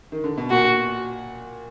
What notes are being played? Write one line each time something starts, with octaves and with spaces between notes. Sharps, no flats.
D#3
D3
B2
A#2 F#4